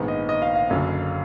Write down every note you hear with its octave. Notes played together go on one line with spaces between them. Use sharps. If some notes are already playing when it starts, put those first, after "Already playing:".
Already playing: A#1 G#2 D#3 G#3 B3
D#5
D#5
F5
F5
F#1 F#2 D3